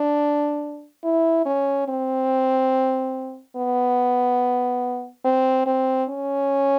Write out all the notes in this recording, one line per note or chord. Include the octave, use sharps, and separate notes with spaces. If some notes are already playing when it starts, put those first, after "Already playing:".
Already playing: D4
E4
C#4
C4
B3
C4
C4
C#4